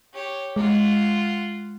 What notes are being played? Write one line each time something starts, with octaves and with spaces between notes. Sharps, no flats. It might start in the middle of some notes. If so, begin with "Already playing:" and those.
G4 C#5
G#3 F4 F#5